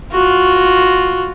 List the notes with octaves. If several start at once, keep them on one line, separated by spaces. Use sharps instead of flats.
F4 F#4